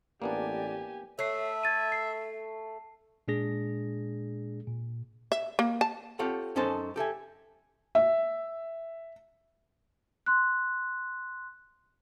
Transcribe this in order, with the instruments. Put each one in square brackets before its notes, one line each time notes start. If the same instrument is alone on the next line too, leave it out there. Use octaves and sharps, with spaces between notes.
[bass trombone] A1 [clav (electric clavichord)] A#3 B3 D4 [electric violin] G4 G#5 [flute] D5
[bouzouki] A3 [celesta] C#5 C7 [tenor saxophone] E5
[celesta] G#6 A6 D#7
C7
[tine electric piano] A#2 G#3 D4 G#4 A#6
A#2
[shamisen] E5
A#3
A5
[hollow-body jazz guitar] C4 F4 G4 A4 C#5 F#5
F#2 C#4 D#4 A4 C5 A5
G4 A4 E5 G#5
[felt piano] E5
[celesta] C6 F#6